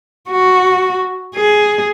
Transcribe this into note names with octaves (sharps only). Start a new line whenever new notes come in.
F#4
G#4